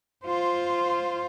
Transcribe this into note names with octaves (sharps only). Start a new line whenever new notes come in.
F4 C5